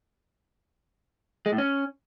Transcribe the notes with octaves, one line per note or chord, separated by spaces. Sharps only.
G#3
A2
C#4